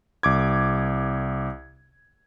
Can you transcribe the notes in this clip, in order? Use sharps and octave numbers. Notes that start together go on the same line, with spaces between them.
C2 D6 G#6